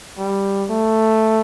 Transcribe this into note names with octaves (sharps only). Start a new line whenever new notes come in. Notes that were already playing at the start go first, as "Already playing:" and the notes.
G3
A3